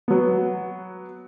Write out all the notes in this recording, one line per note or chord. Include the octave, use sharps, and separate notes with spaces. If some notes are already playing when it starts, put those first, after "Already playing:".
F#3 B3